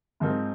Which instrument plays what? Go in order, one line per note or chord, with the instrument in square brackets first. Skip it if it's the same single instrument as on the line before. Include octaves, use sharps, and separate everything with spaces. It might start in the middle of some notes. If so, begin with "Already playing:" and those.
[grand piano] G#2 F3 C4 D#4 A#4